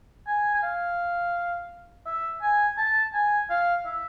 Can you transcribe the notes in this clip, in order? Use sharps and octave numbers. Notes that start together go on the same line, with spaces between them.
G#5
G#5
F5
E5
G#5
A5
G#5
F5
E5